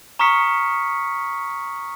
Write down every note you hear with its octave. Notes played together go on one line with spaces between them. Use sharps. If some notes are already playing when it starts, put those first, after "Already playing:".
A#5 C#6 D#6 F6 B6 C#7